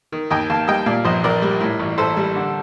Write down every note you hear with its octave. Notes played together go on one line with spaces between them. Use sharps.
D#3
D#2 D#5 G5
D#2 F5 A5
G3 D#5 G5
A#2 D5 F5
A#1 C5 D#5
A#1 A#4 D5
G3
A2
A1
A1 A4 C5
G3
D3